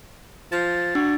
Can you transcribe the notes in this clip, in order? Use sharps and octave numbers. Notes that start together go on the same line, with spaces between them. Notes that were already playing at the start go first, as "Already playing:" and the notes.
F3 A6
D4 F#4